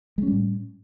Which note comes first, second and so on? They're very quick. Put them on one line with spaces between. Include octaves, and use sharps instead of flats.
G#3 C#4 G3 A2